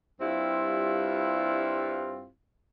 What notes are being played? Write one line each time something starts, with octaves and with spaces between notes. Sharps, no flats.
G2 G3 C4 E4 F4